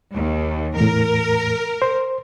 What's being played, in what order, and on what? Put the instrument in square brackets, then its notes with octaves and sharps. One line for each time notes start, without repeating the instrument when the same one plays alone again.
[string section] D#2
[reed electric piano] E2 A2 [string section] A#4
[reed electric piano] C5